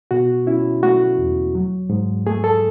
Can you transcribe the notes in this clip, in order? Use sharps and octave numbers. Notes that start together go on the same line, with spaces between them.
B2 F#4
C#4 E4
A3 F#4
E2
F#3
G#2
A3 G#4
A4